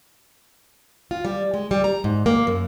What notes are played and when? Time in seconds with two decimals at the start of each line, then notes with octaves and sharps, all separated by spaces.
1.11 F4
1.25 G3
1.54 G#3
1.71 G3
1.84 A#5
2.04 G#2
2.26 A#3
2.47 F#2